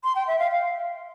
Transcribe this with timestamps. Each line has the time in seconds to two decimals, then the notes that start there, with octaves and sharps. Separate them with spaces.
0.04 C6
0.16 G5
0.27 E5
0.39 F5
0.51 F5